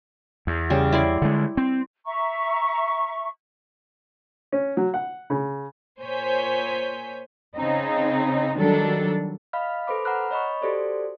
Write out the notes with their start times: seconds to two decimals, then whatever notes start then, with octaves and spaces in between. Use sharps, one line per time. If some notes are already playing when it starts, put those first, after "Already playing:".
0.47 E2
0.70 C#3 G3
0.92 E4 D5 C6
1.22 D3 G#3
1.57 C4
2.05 E5 A#5 C#6
4.52 C#4
4.77 F#3
4.94 F#5
5.30 C#3
6.00 A#2 C5 C#5 G#5 G6 B6
7.56 C#3 C4 D#4
8.56 D#3 F#3 G3 D4 A4
9.53 D#5 F5 B5 F6
9.87 A4 B4 C5 B5 D6
10.05 F#5 A#5 B5 F6 F#6
10.31 C#5 D#5 B5 C#6
10.62 F#4 G4 A4 C5 D5